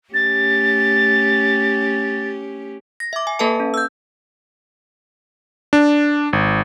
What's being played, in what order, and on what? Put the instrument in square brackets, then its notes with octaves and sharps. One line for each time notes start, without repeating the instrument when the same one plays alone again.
[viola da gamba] A3 C#4 G4 [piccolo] A6
[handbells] A#6
E5 D6
G#5
A#3 A4 B4 E5 A5
C#4
E6 G6
[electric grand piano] D4
G#1